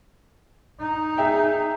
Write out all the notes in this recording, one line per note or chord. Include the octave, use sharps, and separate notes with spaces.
D#4
G#4 E5 G5